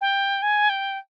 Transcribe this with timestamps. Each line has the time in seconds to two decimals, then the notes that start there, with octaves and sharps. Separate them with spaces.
0.01 G5
0.42 G#5
0.69 G5